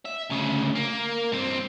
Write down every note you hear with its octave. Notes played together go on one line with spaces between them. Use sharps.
E5
D2 C#3
A#3
G2 C4